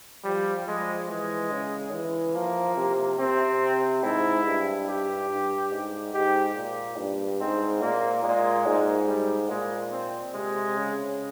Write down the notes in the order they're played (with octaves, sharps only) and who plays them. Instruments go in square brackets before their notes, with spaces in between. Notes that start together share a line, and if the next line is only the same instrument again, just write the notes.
[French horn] F3 [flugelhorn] G3
[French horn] F3 [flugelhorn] G#3
[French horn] E3 [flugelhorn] G#3
[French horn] C#3
E3
[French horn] F3 [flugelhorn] A#3
[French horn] C3
[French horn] C3 [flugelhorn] C4
[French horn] G#2 [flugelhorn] E4
[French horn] G2
[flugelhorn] G4
[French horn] G2
G#2
[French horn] G#2 [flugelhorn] G4
[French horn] A#2
G2
[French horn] G#2 [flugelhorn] C4
[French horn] A#2 [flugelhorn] A#3
[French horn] A#2 [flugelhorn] G#3
[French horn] G#2
[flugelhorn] G3
[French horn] A#2 [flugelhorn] G#3
[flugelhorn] C4
[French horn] C3 [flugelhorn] G#3
[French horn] C#3